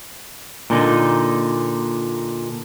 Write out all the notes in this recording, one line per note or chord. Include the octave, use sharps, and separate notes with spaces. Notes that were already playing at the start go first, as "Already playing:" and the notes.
A#2 D3 D#4